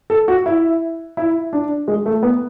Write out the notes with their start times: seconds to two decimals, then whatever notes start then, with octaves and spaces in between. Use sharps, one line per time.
0.10 A4
0.28 F#4
0.46 E4
1.17 E4
1.53 D4
1.88 G#3
2.06 A3
2.23 B3